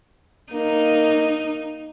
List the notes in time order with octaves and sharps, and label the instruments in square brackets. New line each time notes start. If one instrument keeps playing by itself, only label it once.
[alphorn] A#3 [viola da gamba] D#4